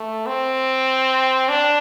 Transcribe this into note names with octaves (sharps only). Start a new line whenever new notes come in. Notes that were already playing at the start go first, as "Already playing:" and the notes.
Already playing: A3
C4
D4